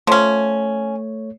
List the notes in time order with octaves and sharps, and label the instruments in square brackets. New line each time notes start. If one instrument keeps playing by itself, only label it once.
[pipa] F3 C#4 [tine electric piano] A3 C#5